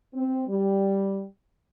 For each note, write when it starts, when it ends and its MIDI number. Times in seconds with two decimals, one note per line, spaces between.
0.14 0.41 60
0.47 1.23 55